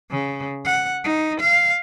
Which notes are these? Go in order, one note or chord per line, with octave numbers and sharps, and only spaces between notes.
C#3
F#5
D#4
F5